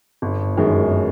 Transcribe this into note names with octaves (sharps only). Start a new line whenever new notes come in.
G1
F#2 D#3 G#3